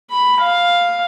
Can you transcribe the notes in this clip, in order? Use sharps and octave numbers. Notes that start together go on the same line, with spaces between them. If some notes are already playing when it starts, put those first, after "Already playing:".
B5
F5